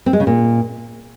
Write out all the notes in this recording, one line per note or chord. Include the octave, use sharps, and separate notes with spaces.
C4
G#3
C#3
A#2